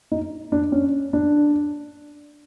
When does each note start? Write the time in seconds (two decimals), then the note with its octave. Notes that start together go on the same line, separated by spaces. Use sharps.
0.12 D#4
0.52 D4
0.72 C#4
1.13 D4